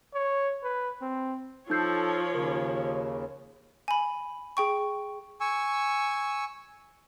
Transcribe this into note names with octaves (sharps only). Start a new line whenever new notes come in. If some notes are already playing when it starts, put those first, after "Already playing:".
C#5
B4
C4
F3 D#4 A4 C#5 G6 C7
D#2 C#3 A#4
G#5 B5
G#4 G5 C#6
G#5 C#6 E6